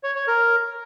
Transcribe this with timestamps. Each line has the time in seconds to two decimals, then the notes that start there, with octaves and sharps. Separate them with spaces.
0.03 C#5
0.15 C#5
0.27 A#4